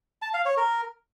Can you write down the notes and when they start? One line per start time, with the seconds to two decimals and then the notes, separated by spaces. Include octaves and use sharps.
0.22 A5
0.34 F5
0.45 C#5
0.57 A#4